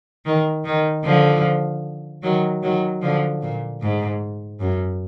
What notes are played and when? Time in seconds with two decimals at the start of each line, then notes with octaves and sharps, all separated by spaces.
0.26 D#3
0.65 D#3
1.04 D3 F3
2.23 D#3 F#3
2.63 D#3 F#3
3.01 D3 F3
3.42 A#2
3.81 G#2
4.60 F#2